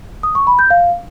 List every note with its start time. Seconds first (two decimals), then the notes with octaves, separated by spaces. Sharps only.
0.23 D#6
0.35 C#6
0.47 B5
0.59 G6
0.70 F5